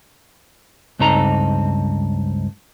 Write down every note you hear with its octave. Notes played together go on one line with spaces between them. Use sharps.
C#2 G2 C4 D#4 A4 A#5